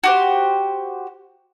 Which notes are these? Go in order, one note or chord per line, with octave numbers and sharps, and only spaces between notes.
F#4 G4 C5